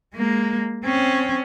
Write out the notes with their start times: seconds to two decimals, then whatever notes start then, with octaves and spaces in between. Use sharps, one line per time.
0.14 G#3 A#3
0.85 C4 C#4